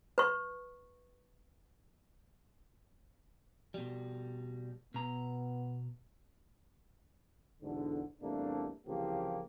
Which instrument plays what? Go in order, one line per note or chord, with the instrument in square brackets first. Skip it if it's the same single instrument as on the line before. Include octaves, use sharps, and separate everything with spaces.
[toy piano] B4 C#6
[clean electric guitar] B2 G3
[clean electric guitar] B2 A#5 [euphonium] B3
[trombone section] B1 E2 G#2 D3
E2 C3 G3 A3 A#3 D4
C2 C#3 E3 F3 A#3 G4